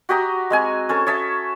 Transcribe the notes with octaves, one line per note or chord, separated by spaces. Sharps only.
F#4 G4 D#5 A#5
G#3 C4 G#5
C#4 A4 C5
C#5 D#5 E5 A5